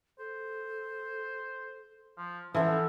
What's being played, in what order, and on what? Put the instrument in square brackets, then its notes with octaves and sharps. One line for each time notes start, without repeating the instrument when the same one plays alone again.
[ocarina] A4 [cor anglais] C5
[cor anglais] F3
[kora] E3 [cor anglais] F3 [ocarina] C#4 [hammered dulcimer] A4 E5 F#5